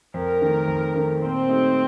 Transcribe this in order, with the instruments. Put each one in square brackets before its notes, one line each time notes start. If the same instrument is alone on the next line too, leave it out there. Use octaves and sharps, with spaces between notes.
[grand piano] F2 [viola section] A#4
[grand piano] D#3 A3
F2
D#3 A3
[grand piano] A#2 [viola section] C4
[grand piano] A3 D#4 G4